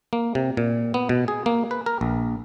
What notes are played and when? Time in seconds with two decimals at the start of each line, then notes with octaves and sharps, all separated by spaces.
0.13 A#3
0.35 C3
0.57 A#2
0.94 B3
1.09 B2
1.28 G#4
1.46 A#3
1.71 B4
1.86 A#4
2.01 A#1